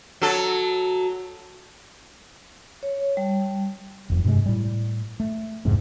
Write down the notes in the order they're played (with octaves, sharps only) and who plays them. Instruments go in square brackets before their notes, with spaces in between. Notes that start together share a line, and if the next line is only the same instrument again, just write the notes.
[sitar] F#3 A4
[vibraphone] C#5
G3
[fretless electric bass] F1 F2
G2 C3 G3 G#3
A2 G3
A3
D1 E2 G#2 C3